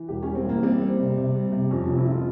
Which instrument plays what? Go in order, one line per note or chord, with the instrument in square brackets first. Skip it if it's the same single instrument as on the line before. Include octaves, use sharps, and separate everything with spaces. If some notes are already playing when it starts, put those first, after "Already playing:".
Already playing: [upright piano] E3
E1 G4
G3 C#4
C4
E3 A#3
G3 C4
G3
C3
C3
G3
C3
F2 C#4
C#4
F1
E4
F4